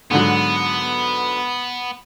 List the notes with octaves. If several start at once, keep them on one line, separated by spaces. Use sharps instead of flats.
G#2 D3 F#3 B3